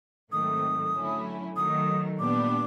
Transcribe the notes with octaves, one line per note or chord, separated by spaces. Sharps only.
G#2 D#3 F#3 A3 C4 D#6
D3 F#3 A3 C#4 E4
D#3 F#3 A3 D#6
A#2 G3 B3 D4 D6